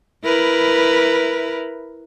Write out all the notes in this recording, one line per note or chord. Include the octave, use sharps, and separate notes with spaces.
E4 A#4 B4